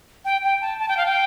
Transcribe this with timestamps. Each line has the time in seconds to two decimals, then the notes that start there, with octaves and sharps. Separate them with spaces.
0.25 G5
0.43 G5
0.61 A5
0.80 A5
0.88 G5
0.97 F5
1.06 G5